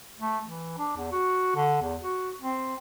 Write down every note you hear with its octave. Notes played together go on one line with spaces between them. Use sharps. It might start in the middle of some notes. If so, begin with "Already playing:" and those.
A3
E3
D4
E2
F#4
D3
E2
F#4
C4